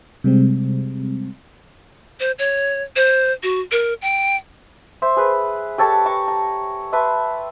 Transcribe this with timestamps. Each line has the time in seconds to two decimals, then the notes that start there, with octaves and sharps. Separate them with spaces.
0.24 C3 G3 G#3 C4
2.20 C5
2.39 C#5
2.96 C5
3.43 F#4
3.72 A#4
4.02 G5
5.02 C5 E5 C6
5.17 G#4 B4
5.78 G4 A4 C#5 A5
6.06 A5 A#5 C#6
6.28 A#5
6.92 B4 E5 A5 C6